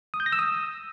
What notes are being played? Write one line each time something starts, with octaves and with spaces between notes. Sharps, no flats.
D#6
G6
A#6
E6
D#6